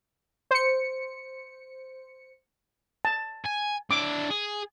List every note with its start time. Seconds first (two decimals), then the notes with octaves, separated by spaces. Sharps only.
0.51 C5 C#7
3.05 A5
3.45 G#5
3.91 D4 E4 D6
4.30 G#4